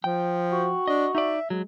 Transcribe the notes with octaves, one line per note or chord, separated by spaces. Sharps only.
F3 G5
F#4
D4 D#5
D#4 D5 E5
F#3 G#3